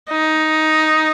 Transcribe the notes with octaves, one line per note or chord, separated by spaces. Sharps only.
D#4